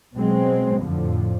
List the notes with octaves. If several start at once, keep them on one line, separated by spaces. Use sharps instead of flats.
B2 F#3 G#3 C4
F2 A2 D3 F3